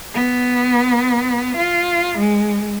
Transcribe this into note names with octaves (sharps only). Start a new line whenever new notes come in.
B3
F4
G#3